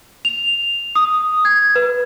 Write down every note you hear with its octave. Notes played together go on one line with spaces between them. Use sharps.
F7
D#6
G#6
B4